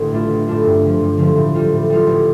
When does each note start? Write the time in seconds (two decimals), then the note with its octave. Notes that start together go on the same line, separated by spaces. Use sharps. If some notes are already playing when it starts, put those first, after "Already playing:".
Already playing: A1 D3
0.11 A2 A3 D4 F4
0.29 A1
0.47 A2 A3 D4 F4
0.64 G2
0.82 D3 F3
1.00 G2
1.18 D3 F3
1.36 A2
1.54 G3 F4
1.72 A2
1.89 G3 F4
2.07 A1